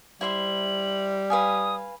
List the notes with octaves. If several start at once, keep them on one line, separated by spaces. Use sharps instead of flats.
G3 E4 C5 E5 F#7
B4 F5 G#5 D#6